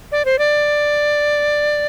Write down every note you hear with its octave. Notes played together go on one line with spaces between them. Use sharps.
D5
C5
D5